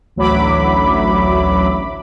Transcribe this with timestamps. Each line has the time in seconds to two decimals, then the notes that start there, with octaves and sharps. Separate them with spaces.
0.16 A1 D2 F#3 E5 B5 D6